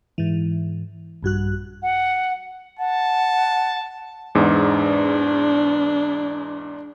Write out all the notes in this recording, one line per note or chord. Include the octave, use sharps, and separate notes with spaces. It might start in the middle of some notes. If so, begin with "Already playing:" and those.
G#2 E3
A#1 G2 F#4 F#6
F#5
F#5 A5
E2 G#2 D4